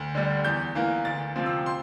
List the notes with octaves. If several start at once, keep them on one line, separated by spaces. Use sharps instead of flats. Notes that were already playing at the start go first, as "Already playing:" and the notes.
Already playing: D2
D3 G3
E2 G6
E3 A#3
D2 A6
C3 F3 C4
E6
C6